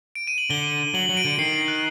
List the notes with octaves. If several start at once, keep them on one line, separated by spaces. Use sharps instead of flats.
D7
D#7
F#7
D3 G7
F#3 F#7
F#3
D7
D3
D#3 C7
C7
F#6